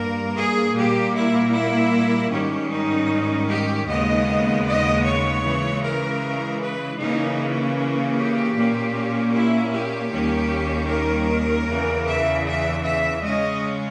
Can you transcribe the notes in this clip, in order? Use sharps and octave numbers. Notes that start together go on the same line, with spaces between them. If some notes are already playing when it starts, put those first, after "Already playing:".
Already playing: G2 G3 A#3 A#4
G#4
A#2 G3 A#3 G4
E4
E4
G#2 D#3 G3 C#4 G4
D#4
G4
D#2 C#3 G#3 B3 D#5
D#5
C#5
C#3 E3 G#3
A#4
B4
C#3 E3 A#3 C#4 D#4
G4
A#2 A#3 C#4
E4
G4
D#2 D#3 G3 A#3 C#4
A#4
E2 C#3 E3
E5
E5
E5
C#3 G#3 C#4 D#5